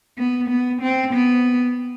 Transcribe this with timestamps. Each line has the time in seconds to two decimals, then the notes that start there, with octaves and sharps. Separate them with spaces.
0.18 B3
0.49 B3
0.81 C4
1.13 B3